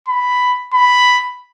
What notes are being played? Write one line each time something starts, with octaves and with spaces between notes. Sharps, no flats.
B5
B5